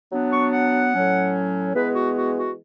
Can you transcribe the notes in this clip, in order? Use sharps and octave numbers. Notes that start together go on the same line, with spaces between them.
F#3 B3 D4
C#6
F#5
A2 F#3 C#4
E3 G#3 B3 B4
F#4
F#4
F#4